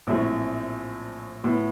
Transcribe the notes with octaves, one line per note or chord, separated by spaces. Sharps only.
A#1 A2 F#3 A3 C4
A2 F#3 B3